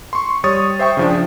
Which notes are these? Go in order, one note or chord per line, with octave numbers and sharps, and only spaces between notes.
C6 C#6
G3 C#5 C#6 D#6 A6
C5 E5 G5 C#6
C#3 F3 D4